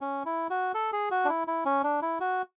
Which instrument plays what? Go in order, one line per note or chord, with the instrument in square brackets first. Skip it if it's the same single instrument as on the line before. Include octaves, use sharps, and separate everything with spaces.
[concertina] C#4
E4
F#4
A4
G#4
F#4
D4
E4
E4
C#4
D4
E4
F#4